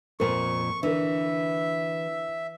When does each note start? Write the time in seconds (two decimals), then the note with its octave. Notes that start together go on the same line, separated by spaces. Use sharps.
0.20 F2 A#2 A#4 C#6
0.83 D3 E3 A#4 E5